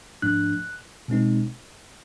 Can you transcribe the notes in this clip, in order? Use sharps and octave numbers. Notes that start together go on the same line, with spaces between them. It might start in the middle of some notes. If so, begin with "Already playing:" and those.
G#2 F3 A3 D4 F#6
B2 G#3 C4 D#4